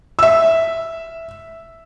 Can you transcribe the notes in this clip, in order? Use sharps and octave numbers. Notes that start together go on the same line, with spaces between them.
E5 E6